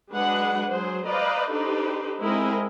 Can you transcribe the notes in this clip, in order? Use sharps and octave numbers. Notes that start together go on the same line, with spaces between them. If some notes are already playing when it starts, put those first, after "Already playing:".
F#3 G#3 D4 G#4 B4 F#5
F#3 G#4 C5
B4 C5 D5 D#5 F5 A#5
D4 D#4 G4 A4 B4 C5
G#3 C4 E4 G#4 A#4 D#5